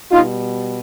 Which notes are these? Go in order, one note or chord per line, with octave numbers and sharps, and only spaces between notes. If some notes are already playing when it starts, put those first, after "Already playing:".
B2 G3 D#4 F4